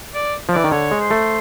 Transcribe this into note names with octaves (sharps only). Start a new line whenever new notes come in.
D5
F3
E3 D5
D#3
D3 C#5
G#3
C5
A3